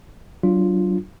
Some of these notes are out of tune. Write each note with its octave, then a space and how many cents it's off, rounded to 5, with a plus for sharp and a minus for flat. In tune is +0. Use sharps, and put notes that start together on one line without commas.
F#3 +30 D4 +0 F4 +0